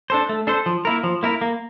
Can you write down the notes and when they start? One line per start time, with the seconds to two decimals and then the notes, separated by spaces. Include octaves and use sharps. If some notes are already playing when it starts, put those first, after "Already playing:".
0.10 D4 A4 C5
0.29 A3
0.47 D4 A4 C5
0.66 F3
0.85 A#3 E4 A#4
1.04 F3
1.23 A#3 E4 A#4
1.41 A#3